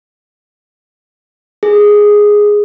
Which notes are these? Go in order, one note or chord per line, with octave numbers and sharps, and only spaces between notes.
G#4